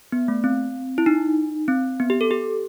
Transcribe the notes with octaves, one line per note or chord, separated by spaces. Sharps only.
B3
A3
C4
E4
D#4
C4
B3
G4
A4
G4